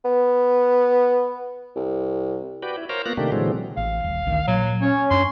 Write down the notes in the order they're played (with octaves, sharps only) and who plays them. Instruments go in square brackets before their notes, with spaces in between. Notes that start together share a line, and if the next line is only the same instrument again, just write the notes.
[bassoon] B3
C2
[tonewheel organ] F#4 B4 D5 G5
E4
A#4 C5 C#5 F5 G5 A#5
A#3 B3 F4 F#6 A#6
C3 D#3 A3 A#3 D4 G4
A#2 D3 E3 F#3 G#3 C4
[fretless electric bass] A1 [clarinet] F5
[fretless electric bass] D#1
A1 D2 D#3
[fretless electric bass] A#2 [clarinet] F#3
[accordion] C#4 [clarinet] C#5
[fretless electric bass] F#2 D4 [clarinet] C6